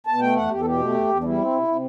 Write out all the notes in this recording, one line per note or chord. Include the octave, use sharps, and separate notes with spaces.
B2 A5
A3 G5
E2 F#5
E2 G4
A4
B2 G4
A3
E2
E2
D4
G3 E4
C4
C3
C3